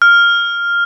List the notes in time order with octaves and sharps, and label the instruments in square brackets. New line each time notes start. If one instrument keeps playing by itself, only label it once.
[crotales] F6